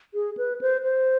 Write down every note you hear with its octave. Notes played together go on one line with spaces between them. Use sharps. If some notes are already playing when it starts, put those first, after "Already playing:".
G#4
B4
C5
C5